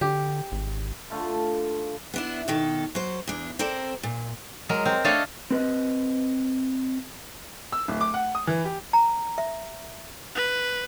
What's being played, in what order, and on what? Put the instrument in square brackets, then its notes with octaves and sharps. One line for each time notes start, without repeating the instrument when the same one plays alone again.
[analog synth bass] D3 [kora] G4
[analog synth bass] G#1
[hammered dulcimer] D3 A3 F4
[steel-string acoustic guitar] B3 D4 E4
B2 D#3 A4
F#3 C5
E2 D4
C4 A4 A#4 C5 D5
A#2
[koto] F#3 G#3 A#4
C4 A#4
A3 D4 A4 C#5 D#5 F5
[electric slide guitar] C4 B4 D#5
[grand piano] E6
D1
D6
F#5
D#6
E3
G4
[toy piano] A#5
E5
[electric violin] B4